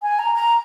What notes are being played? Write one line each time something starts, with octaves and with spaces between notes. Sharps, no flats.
G#5
A#5
A#5